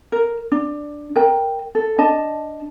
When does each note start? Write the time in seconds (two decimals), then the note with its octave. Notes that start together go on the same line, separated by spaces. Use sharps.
0.12 A#4
0.52 D4
1.16 A#4 G5
1.75 A4
1.98 D4 D#5 A5